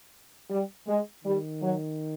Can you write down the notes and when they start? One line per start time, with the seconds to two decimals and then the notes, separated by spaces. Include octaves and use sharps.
0.50 G3
0.88 G#3
1.24 D#3 G3
1.62 F#3